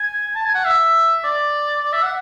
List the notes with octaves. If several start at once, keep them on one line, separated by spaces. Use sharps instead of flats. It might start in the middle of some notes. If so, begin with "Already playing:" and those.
Already playing: G#5
A5
G#5
F#5
E5
D5
D5
E5
F#5